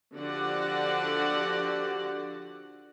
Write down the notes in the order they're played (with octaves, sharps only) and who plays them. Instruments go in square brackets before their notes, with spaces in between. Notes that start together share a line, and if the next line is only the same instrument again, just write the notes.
[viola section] D3 F3 F#4 G4 D5 F#5